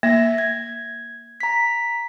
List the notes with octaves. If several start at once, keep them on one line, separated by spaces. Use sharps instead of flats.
A#3 E5 A#6
G#6
A#5 B6